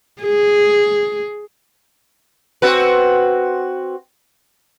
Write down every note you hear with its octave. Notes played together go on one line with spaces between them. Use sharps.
G#4
C4 F#4 B4